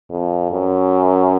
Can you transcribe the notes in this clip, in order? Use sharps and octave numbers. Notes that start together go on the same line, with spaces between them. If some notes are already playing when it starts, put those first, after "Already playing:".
F2
F#2